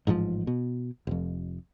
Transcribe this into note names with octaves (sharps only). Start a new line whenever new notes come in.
A1 G#2 D#3 F3
B2
F1 F2